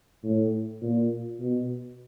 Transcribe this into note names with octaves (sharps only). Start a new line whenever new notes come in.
A2
A#2
B2